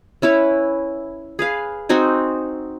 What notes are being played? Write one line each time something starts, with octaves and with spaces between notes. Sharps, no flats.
C#4 E4 B4 C#5
G#4 B4 F5
C4 D#4 F#4 G#5